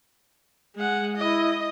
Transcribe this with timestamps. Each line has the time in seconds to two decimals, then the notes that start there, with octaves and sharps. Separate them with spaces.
0.76 G#3 F#5
1.17 E4 D#5